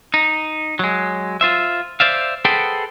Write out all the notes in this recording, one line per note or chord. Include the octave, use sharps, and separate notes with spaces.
D#4
F#3 G#3
F4 C5 E5
C5 D5 E5 F5
G#4 A4 B4 C5 F#5 G5